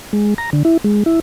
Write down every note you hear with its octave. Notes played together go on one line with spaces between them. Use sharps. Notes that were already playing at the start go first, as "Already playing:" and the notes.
G#3
A#5
D3
E4
G#3
E4